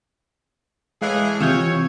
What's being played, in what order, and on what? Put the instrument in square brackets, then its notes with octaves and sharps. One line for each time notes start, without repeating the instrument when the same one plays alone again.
[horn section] A2 E3 G#4 [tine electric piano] G#3 F5 F#6
[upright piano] C3 [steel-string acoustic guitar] E3 F4 F#5 [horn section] C#5 [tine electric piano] E6 F6 G6